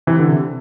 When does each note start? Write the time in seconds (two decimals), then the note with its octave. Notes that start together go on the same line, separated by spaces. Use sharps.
0.07 C3 E3
0.20 D3
0.29 C3